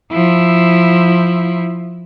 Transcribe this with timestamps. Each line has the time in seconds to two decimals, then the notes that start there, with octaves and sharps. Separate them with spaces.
0.12 F3 E4